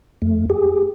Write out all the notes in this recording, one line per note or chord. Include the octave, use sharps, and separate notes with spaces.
F2 A3
G4 G#4